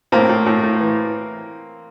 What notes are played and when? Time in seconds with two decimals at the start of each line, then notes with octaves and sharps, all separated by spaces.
0.12 A2 A#3 C4
0.29 A2
0.46 A2
0.63 A2
0.80 E3